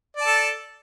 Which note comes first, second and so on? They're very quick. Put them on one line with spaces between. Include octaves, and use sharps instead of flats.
D5 A5 A4